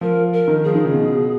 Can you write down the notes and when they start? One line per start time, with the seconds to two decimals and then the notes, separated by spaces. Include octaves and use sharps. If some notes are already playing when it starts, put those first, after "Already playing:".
0.01 F3 A#4
0.33 A#4
0.48 D#3
0.64 F3 G#4
0.75 D#3
0.85 C#3
0.94 B2